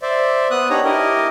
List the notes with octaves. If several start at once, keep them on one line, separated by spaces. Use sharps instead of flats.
C5 D5 E5
B3 D#6 F#6
D4 D#4 G4 C#5 A#5
E4 G4 A#4 D#5